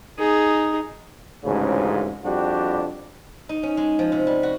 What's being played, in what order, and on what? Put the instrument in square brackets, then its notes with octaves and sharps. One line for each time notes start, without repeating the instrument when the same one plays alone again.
[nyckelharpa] D#4 G#4
[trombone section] A1 D2 G#2 C#3
F2 G3 D4 F#4 G4
[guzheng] D#4
C#4
G#3
F3
C3
G3
F#4